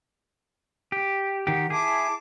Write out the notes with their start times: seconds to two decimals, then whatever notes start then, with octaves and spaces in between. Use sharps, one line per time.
0.92 G4
1.47 D#3 G4 F#5
1.70 E4 G#4 A5 D6